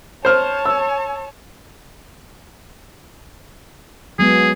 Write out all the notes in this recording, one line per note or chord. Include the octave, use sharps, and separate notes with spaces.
C5 C#5 A5 F6
E6
F#3 G#3 B3 G#4